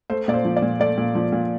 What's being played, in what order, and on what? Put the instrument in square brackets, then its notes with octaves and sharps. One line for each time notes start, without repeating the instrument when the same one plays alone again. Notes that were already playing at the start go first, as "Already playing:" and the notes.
[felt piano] A3 C5
A#2 D5
C5
F3
D5
A#2
A3 D5
A#2
F3
A#2